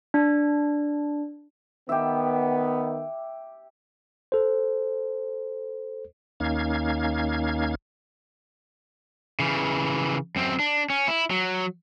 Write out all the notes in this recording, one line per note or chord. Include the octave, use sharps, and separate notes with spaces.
D4
D#3 B3 G4 E5
A4 C5
D#2 A#3 C#4 D#4 F5 G#6
C#3 E3
F#2 C4
D4
C#4
E4
F#3